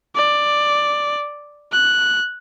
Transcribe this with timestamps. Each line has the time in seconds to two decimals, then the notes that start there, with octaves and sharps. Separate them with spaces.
0.16 D5
1.72 F#6